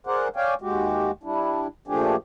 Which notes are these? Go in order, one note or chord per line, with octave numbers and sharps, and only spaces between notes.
G#4 A#4 C5 D5 F#5
C#5 D5 F5 G5 G#5
D#2 G#3 F#4 G4
G3 D4 E4
A#2 F3 A3 D4 G4 G#4